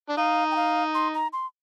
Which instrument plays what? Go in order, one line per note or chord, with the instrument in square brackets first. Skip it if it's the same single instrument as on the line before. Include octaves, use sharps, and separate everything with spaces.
[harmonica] D4
[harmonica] D#4 [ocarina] F5
[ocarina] G5
F5
C6
A#5
C6